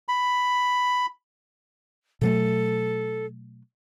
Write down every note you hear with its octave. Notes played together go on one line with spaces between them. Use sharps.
B5
B2 F#3 A3 A4